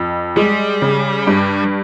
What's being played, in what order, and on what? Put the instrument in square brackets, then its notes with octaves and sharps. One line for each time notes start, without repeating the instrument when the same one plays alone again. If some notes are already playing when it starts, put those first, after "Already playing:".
Already playing: [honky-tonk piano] F2
[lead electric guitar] G3 [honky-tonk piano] G#3
[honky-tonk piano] C#3
G2